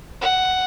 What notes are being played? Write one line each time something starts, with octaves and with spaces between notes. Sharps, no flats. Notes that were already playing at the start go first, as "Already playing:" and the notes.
F#5